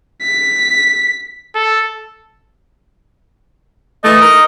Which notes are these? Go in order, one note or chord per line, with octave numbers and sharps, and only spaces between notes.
B6
A4
E3 A3 D#5
D#4 A#4